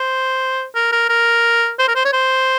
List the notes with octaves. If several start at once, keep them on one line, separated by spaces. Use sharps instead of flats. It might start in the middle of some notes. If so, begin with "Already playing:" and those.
Already playing: C5
A#4
A#4
A#4
C5
A#4
C5
C#5
C5